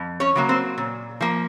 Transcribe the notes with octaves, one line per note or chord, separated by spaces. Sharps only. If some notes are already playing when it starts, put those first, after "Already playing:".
Already playing: F2
C#4 C#5
C#3 F#3 A#3
C4 C5
A#2
F3 A#3